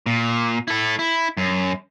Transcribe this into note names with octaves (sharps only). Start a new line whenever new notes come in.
A#2
E4 A4
E4
F#2